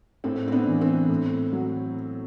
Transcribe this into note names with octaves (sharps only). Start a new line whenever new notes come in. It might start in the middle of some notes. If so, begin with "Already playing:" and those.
A2 C4
C4
B3 D4
E3
C4
A2
F#3